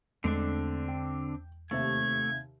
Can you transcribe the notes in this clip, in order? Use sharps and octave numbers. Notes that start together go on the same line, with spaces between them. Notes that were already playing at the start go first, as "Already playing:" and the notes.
E2 D3 G#3 A3 C4 D4
G5
D#2 C3 A3 E5 G#6